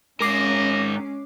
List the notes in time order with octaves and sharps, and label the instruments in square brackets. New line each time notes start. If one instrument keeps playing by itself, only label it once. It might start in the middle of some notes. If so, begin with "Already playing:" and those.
[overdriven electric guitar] G#2 A#4 [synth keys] G#3 D6 C7 [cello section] C#4 [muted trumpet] D#5